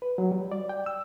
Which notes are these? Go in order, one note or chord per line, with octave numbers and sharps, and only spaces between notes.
B4
F#3
G3
D5
G5
E6